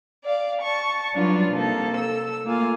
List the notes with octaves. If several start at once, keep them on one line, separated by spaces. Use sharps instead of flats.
D5 F5
A5 C#6
F#3 G3 D4 D#4 F4 B4
C3 A#3 D#4 A4
A4 E6
A3 A#3 F4 G#5